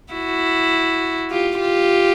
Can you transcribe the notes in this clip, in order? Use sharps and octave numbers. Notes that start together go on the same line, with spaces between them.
E4 F#4
F4 G4
F4 G4